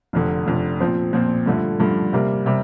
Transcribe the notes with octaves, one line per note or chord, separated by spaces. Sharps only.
F1 F2 D3
F1 F2 D3
A#2 F3 C4
A#2 F3 C4
G2 D3 F3 A3
G2 D3 F3 A3
C3 G3 A#3
C3 G3